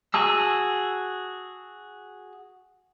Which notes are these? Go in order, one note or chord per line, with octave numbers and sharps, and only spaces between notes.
F#4 G#4 A5 E6